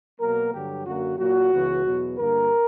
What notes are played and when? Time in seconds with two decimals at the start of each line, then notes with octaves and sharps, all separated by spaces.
0.20 B2 F#3 A#3 A#4
0.53 G2 D3 F#3 G4
0.86 F#2 D3 A#3 F#4
1.19 A#2 F#3 A#3 F#4
1.52 C#2 C#3 E3 B3
1.85 E2 B2 F#3 B3
2.17 G2 D3 A#3 A#4